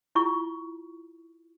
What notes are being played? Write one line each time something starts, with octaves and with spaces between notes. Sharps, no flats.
E4 F4 C#6